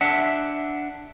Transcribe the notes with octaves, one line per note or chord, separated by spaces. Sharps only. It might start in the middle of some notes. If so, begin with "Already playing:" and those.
D4 E5 F#5